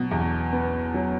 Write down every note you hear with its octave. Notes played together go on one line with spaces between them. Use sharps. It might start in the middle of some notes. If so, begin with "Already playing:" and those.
Already playing: B2 F#3
E2
B3
F#3